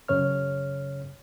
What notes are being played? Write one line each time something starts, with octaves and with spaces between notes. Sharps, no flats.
F#2 C#3 C#5 F6